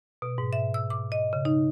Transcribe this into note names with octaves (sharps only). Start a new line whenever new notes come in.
B2
G#2
E5
E6
D6
D#5
C#3
D#4